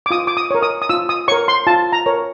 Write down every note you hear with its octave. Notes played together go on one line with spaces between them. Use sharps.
D6
F4 D#6
D6
D#6
A#4 C#5
D#6
D#6
F4 E6
D#6
A#4 C#5 C#6
C6
F4 A5
A#5
A#4 C#5